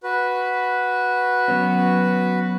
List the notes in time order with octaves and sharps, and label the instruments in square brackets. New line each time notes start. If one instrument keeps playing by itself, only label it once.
[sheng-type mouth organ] F#4 B4
[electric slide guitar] F#3 B3 C#4